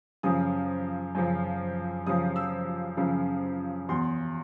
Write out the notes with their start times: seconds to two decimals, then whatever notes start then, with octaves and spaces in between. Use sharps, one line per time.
0.23 F#2 C#3 F3 D#6
1.15 F#2 C#3 F3
2.07 F#2 C#3 F3 D#6
2.36 E6
2.97 F#2 C#3 F3
3.88 E2 B2 F#3 C6